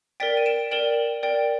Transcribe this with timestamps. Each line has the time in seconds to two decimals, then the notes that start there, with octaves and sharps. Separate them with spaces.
0.20 A#4 D5 G5 A6 B6
0.37 D#7
0.46 D7 E7
0.71 A#4 D5 G5 E7 F#7
1.23 A#4 D5 G5